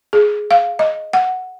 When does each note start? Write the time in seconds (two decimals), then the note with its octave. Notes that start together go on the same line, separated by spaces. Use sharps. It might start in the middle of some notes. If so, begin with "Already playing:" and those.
0.13 G#4
0.51 F5
0.79 D#5
1.13 F#5